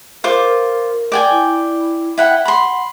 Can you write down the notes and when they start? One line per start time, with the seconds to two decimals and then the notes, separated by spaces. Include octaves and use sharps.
0.24 F4 A#4 C5 D6
1.12 D5 G5 G#5
1.31 E4
2.18 E4 F#5 G5
2.45 F#5 B5 C6